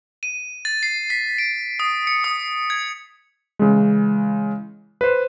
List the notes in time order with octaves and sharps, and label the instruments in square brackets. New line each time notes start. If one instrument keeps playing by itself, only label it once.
[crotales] D#7
A6
C7
B6
D7
D#6
C#7
D#6
G#6
[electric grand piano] C#3 E3 G#3
B4 C5